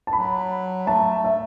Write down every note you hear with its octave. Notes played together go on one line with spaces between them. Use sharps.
A5
F#3 B5
A3 A5
E5